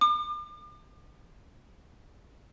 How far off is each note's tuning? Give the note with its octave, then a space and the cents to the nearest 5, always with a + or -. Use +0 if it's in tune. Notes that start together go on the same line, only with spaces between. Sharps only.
D6 +40